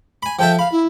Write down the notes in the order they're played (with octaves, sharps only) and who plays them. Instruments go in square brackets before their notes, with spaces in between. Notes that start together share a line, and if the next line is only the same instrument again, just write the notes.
[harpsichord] G#5 B5
[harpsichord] F3 A4 E5 [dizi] G5
[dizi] F5 [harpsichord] B5
[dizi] E4